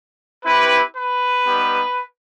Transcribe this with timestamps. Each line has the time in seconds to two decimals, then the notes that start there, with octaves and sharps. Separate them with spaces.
0.45 C4 E4 G4 B4
0.95 B4
1.46 G3 B3 D#4 G4